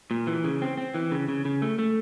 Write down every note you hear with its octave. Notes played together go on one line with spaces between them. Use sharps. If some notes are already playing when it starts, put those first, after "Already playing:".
A#2
E3
C#3
C4
C4
E3
C#3
C#3
C#3
A3
A3